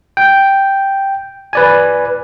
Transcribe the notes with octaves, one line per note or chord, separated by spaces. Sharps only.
G5
B4 D5 G#5